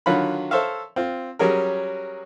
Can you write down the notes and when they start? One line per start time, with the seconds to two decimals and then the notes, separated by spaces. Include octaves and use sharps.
0.06 D3 D#3 F#3 F4 F#4 B5
0.51 A4 C5 C#5 E5 F5
0.96 C4 F4
1.39 F#3 G3 C#4 G#4 A#4